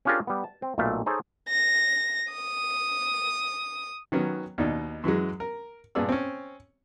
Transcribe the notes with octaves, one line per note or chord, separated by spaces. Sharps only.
C#4 D4 F4 G4 G#4 A#4
G3 B3
A5
C4
B1 A#2 A3 E5 F5
D#4 G#4 A4 C5 C#5 D#5
A#6
D#6
D#3 F#3 B3 C#4
D#2 B2 D4 D#4
F#2 E3 F#3 G#3
A#4
G2 A#2 B3 G#4 D5 E6
C4 C#4